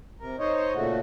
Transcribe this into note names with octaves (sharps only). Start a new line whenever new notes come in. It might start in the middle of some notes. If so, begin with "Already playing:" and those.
C3 A#4
D#4 C5 C#5 D#5
A#2 C#3 A3 F#4